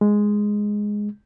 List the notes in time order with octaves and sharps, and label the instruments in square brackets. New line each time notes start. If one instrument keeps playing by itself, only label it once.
[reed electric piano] G#3